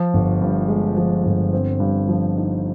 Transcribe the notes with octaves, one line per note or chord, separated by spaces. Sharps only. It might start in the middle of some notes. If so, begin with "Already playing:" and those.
Already playing: F3
G1
G2
G#3
F3
G1
C4
G2
F3
D#4